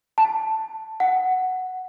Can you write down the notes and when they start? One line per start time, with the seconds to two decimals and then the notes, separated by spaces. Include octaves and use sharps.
0.18 A5
1.00 F#5